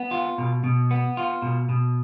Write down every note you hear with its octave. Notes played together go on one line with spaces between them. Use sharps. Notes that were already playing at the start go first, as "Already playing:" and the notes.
Already playing: B3
F4
B2
B2
B3
F4
B2
B2